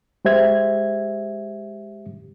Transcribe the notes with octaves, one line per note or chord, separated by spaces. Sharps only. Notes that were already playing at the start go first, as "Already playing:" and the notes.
G#3 G4 C5 E5 G#6